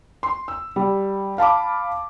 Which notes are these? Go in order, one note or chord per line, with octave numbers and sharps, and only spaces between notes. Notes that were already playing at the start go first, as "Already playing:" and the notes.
C6
E6
G3
F5 A5 B5 D6